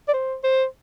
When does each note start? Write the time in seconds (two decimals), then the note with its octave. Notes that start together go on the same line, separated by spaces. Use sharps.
0.08 D5
0.14 C5
0.44 C5